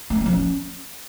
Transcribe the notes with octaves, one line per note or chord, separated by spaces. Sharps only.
A3
C#4
A#3
F3
C#4